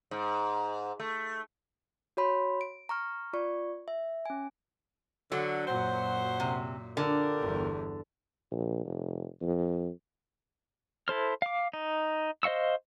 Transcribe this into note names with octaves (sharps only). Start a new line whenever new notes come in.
G#2
A3
F#4 C#5 B5 C6
D7
A#5 C#6 F6
F4 D5 C#6
E5
C#4 G#5
D3 F#3
F#2 A#2 C5 F#5
C3
D3 F4 G4 A#4
G1 E2
A#1
F1
F2
E4 A4 C5 F6
F5 D6
D#4
C5 D#5 F5 C#6 E6